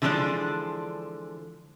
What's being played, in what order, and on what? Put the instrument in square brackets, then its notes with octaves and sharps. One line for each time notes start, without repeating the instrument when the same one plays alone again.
[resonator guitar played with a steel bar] D3 E3 F3 G#3 D4 D5